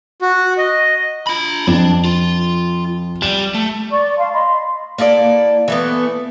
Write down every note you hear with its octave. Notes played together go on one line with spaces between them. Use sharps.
F#4
D#5
F4 B5
F2 D4
F4
G3 E7
A3
D5 C#6
F5 A5 C6
D#5 B5 C6
A#3 E4 A4 D5
E3 A3 B3